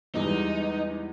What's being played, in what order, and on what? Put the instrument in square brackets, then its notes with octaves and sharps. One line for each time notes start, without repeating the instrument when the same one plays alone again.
[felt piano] E2 G3 G#3 [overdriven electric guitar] D#4